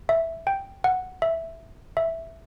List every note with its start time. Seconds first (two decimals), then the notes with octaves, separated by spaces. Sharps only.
0.09 E5
0.47 G5
0.84 F#5
1.22 E5
1.97 E5